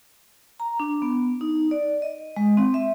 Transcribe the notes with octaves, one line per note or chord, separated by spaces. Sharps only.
A#5
D4
B3
D#4
D5
D#5
G#3
C4
E5